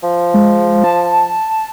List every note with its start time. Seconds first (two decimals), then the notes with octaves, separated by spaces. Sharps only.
0.03 F3
0.34 G#3
0.84 A5